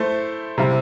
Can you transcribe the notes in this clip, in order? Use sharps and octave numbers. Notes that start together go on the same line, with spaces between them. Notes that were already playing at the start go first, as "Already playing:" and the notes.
Already playing: A3 E4 A4 C5
C3 G3 E4